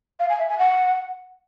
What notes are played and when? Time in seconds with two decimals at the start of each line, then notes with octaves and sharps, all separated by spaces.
0.20 F5
0.29 G#5
0.39 E5
0.49 G#5
0.59 F#5